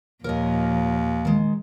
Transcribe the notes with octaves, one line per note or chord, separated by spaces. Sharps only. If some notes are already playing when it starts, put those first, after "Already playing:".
D#2 A#2 F3 A#4 C#5 D#5
D#3 G#3